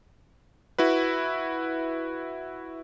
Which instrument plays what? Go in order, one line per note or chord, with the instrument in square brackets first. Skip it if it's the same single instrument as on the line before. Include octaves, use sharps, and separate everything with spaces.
[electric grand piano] E4 F#4 B4